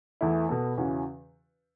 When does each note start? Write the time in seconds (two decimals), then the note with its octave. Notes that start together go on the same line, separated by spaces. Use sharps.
0.21 E2 E3 A3 E4
0.49 B2 B3 A4
0.77 E2 C#3 E3 C#4 F#4